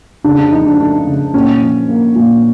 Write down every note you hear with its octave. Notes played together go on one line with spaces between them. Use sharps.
C#3 D4
D4
F3 D#4
D4
A3 D4
C#3
A#2 C#4
F3
A#3
A#2